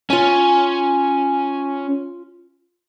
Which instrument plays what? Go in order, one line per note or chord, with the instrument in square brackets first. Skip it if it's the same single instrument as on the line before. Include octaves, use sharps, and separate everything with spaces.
[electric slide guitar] C#4 [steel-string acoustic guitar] F4 G#5